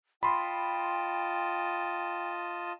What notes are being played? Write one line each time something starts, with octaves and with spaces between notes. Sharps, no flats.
F4 D#5 G5 A5 B5 C6